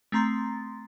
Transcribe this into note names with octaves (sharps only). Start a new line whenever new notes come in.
A3 C4 A#5 C6 A6